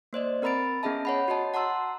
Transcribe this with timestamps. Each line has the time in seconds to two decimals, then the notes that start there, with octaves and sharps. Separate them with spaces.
0.13 A#3 C5 D5 D#5
0.42 C4 A#4 A#5 B5 A6 D7
0.83 B3 C#4 G#4 D#5 E5 A5
1.05 C#5 F#5 B5
1.28 F#4 C#5 D#5 A5
1.54 F#5 A5 A#5 C6 E6